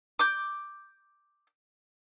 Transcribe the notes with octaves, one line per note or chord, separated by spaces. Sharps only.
D6 G6